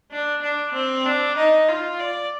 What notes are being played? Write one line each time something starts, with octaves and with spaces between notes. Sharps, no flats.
D4
D4
C4
D4
D#4
F4
D5